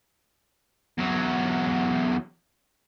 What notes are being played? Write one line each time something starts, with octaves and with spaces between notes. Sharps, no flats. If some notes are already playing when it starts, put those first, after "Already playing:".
E2 F#3